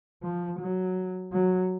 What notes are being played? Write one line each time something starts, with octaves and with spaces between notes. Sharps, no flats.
F3
F#3
F#3